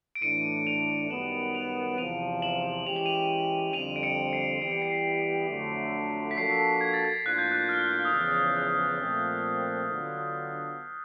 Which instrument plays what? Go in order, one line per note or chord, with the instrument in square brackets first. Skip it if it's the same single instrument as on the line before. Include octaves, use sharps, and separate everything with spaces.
[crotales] D7
[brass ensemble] A2 E3 A3 D4 [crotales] C#7 D#7
[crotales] D#7 F7
[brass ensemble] F#2 D#3 G3 B3 [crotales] E7 F#7
[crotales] D#7 F7
[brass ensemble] E2 C3 F3 [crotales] D#7 F7
[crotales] E7 F#7
[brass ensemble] E3 G#3 C#4 E4 G4 [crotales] F7
[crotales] F#7
D#7 F7
[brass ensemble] F2 D3 G3 C4 [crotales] D#7 F7
[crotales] D7
C#7 D#7
C7 D7
[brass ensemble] E3 G3 B3 E4 G4 [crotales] D7
[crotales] C#7
C7
B6 C#7
[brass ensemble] F2 D3 F#3 A3
[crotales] B6
[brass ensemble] F3 A#3 D4 F#4 A4 [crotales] C7
[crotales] G#6
A6
G#6
[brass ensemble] A2 F3 A#3 D4 F4 [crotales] F#6
[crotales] G6
F#6
F6
D#6
[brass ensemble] E2 C#3 F3 [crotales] E6
[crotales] F#6
[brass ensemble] A#2 F3 A3 C4
D3 F#3 B3 D4 F4